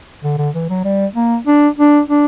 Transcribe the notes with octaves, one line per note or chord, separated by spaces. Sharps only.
D3
D3
E3
F#3
G3
A#3
D4
D4
D4